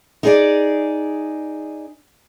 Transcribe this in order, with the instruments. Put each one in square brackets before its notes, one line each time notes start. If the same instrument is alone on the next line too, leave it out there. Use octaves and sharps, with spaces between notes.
[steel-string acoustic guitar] D#4 G#4 D5